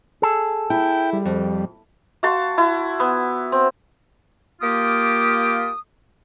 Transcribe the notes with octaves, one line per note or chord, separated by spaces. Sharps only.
G#4 A4
E4 G5
G3
F2
F#4 F5 A5 C6
E4
B3
C4
A#3 F4 G4 D#6